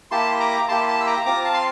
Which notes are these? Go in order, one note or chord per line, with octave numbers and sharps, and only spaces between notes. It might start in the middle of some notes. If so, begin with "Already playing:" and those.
A#3 E4 G4 A5 C6
A#5 D6
A#3 E4 G4 A5 C6
A5 C6
E6
A#5 D6
C4 F4 A#5 D6
F5 A5
C6